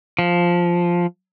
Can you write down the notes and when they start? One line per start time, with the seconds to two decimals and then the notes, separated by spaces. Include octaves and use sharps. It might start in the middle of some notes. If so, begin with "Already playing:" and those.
0.19 F3